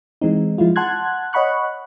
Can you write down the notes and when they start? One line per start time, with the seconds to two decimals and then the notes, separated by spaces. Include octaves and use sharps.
0.22 E3 G#3 C4 D#4
0.58 F3 G#3 E4 F4
0.76 F#5 A5 C6 F#6 G#6
1.33 C#5 D#5 F#5 B5 C#6 F#6